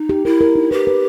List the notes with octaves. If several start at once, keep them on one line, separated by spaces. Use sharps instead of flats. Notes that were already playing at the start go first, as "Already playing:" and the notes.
Already playing: D#4
G4
E4 A#4
A#4
D#4
G4 B4
B4